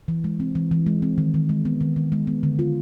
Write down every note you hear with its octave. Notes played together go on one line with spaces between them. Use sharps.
E3
G#3
C4
E3
E3
G#3
C4
D#3
D#3
G#3
B3
D#3
D#3
G#3
B3
D3
F4